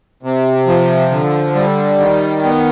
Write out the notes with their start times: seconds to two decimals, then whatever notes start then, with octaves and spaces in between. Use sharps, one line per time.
0.23 C3
0.67 F3
1.11 D3
1.55 G3
1.99 D#3
2.44 B3